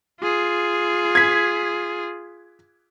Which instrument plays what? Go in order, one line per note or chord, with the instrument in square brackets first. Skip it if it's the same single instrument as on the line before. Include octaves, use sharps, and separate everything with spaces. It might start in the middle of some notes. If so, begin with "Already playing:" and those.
[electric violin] F4 G#4
[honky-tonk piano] G#6 B6